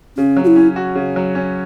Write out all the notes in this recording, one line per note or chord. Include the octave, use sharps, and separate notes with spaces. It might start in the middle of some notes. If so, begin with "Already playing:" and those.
C#3 C#4
F#3
F#4
E4
C#4
F#4
C#3
F#3
C#4